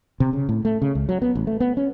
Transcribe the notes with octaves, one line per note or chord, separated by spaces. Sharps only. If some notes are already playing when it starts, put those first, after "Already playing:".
C3
C#3
A2
A3
C#3
C#2
F#3
B3
A1
A3
B3
C#4